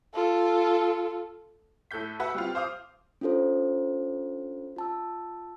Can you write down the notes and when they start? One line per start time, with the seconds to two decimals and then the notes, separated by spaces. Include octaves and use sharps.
0.14 F4 A4
1.91 A2 A4 F#6 G6 B6
2.20 F#4 B4 E5 F#5
2.35 G3 C4 F4
2.55 C5 F5 D6 D#6
3.21 C#4 D4 F4 A4 C5
4.76 F4 A5 E6